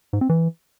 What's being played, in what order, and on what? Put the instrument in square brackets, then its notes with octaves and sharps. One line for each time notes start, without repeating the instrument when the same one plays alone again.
[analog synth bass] G#2
C4
E3